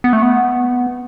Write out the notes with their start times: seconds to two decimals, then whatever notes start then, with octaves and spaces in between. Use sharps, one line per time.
0.04 B3
0.13 A3
0.23 B3